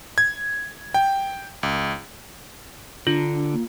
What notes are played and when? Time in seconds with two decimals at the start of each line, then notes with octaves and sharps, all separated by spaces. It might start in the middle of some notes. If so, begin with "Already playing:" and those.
0.18 G#6
0.94 G5
1.63 C#2
3.07 D3 D4 F4
3.53 A#3